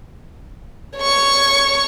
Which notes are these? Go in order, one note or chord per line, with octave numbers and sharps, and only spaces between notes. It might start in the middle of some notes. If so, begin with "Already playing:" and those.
C#5 C#6